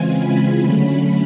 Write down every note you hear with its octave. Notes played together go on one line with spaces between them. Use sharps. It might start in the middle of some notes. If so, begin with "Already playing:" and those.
Already playing: C#3 E3 G#3 C4 F4 G#5
B5
D3 F#3 A3 C#4